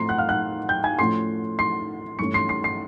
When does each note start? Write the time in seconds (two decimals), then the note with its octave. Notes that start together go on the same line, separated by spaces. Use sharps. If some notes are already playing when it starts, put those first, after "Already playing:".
Already playing: A2 F3 A3 C4 A#5 C6 C7
0.09 F#5 F#6
0.18 F5 F6
0.29 F#5 F#6
0.68 G5 G6
0.84 G#5 G#6
0.99 A2 F3 A3 C#4 C6 C7
1.59 C6 C7
2.19 G2 E3 A3 C#4 C#6 C#7
2.34 C6 C7
2.49 C6 C7
2.64 C6 C7